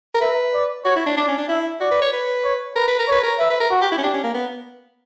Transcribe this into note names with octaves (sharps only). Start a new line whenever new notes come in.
A#4
B4 E5
D5
F#4 C#5
E4
D4
D4 D5
C#4
D4
E4 E5
F#4 D5
B4
C#5
B4
C#5
A#4 B4
B4
A#4
B4 C#5
A#4
B4 E5
B4
A#4
F#4
G4
E4
C#4
D4 G4
C#4
A#3
B3